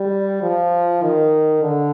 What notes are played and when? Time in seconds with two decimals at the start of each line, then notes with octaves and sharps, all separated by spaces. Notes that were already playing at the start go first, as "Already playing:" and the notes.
Already playing: G3
0.42 F3
1.03 D#3
1.62 D3